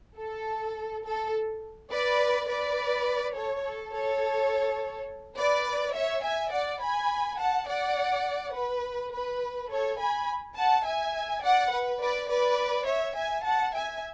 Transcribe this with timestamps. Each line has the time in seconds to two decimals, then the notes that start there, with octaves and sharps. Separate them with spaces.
0.18 A4
1.05 A4
1.91 B4 D5
2.48 B4 D5
3.35 A4 C#5
3.64 A4
3.93 A4 C#5
5.38 B4 D5
5.95 C#5 E5
6.24 E5 G#5
6.53 D5 F#5
6.81 G#5 B5
7.39 F#5 A5
7.68 D5 F#5
8.55 B4
9.13 B4
9.70 A4 C#5
9.99 G#5 B5
10.56 F#5 A5
10.86 E5 G#5
11.43 D5 F#5
11.72 B4
12.01 B4 D5
12.30 B4 D5
12.87 C#5 E5
13.16 E5 G#5
13.45 F#5 A5
13.74 E5 G#5